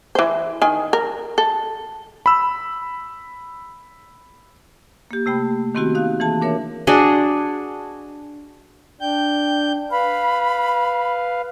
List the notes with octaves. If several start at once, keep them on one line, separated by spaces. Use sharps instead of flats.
E3 C5
D#3 G#5
A#4
A4
B5 E6
A#3 G4
C3 A3 G5 B5
D#3 B3 C4 E4 F#4 G4
D#4 F5 F#6
E3 A#3 G#4 A5
D4 A#4 C#5 E5
D4 F#4 G#4 D#5
D4 G5 G6
B4 F5 B5